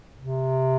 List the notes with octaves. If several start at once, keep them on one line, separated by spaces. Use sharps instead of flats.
C3